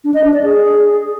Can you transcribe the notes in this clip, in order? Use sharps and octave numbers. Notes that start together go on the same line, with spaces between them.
D4
D#5
D4
D5
G#4